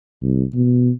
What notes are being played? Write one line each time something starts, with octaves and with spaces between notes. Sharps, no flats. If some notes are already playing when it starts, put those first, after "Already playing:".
C2
B2